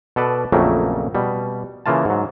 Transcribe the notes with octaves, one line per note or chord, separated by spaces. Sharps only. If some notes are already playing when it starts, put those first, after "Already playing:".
B2 A4 B4 D5
A#1 F2 C#3 F#3 A3 A#3
B2 G3
C#3 E3 A#3 F4 A5
G#2 F#3